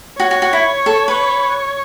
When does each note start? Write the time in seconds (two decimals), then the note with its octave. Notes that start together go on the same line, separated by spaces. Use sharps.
0.20 F#4 C#5
0.31 F#4
0.42 F#4
0.53 E4
0.86 A4
1.08 B4